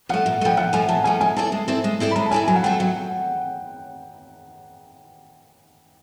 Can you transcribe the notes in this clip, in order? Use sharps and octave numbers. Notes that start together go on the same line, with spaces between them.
F3 A3 F#5
A#2
F3 A3 G5
A#2 F#5
F3 A3 G#5
A#2 A5
F3 A3 G#5
G#3 G#5
C4 E4 A4 D5 A5
G#3
C4 E4 A4 D5
G#3
C4 E4 A4 D5
B5
G#3 A#5
A5
C4 E4 A4 D5 G#5
F#3 G#5
F#5
A3 C4 F4 A4 G5
F#3 F#5